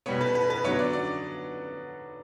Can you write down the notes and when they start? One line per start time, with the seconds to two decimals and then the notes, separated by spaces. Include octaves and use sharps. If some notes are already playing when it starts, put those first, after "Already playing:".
0.06 B2 G3 B3 C#5
0.21 B4
0.35 B4
0.50 B4
0.64 D3 F#3 B3 C#5
0.79 D5
0.93 D5